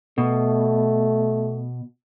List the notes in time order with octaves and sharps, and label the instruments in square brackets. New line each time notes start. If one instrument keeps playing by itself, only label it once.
[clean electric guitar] B2 [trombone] A3